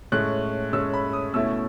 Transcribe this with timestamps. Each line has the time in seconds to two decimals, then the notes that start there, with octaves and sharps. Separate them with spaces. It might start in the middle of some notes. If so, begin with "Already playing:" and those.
0.12 A2 G#3 C#4 F#6
0.73 A2 G#3 C#4 E6
0.94 B5
1.13 D#6
1.34 B2 A3 C#4 E4 E6